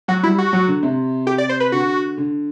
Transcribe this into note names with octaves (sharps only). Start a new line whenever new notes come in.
F#3 F#4
G3 E4
F#4
F#3
D3
C3
G4
D5
C5
B4
D3 F#4
D3